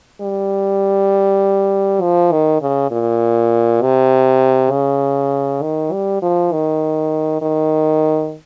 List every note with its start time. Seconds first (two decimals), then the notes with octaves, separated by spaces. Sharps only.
0.21 G3
2.02 F3
2.32 D#3
2.62 C#3
2.91 A#2
3.82 C3
4.71 C#3
5.62 D#3
5.92 G3
6.22 F3
6.53 D#3
7.42 D#3